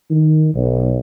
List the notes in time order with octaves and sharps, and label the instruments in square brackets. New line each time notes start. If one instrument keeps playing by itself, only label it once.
[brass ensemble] D#3
B1